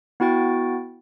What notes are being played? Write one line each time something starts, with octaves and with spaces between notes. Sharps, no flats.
B3 E4 F#4 G5 A6